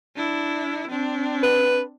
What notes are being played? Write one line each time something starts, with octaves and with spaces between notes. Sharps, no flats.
D4 E4
C4 D4
B4